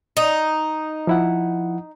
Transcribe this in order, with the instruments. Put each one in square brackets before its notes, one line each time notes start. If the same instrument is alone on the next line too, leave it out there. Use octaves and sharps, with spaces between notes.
[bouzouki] D#4
[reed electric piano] F3 E4 F#5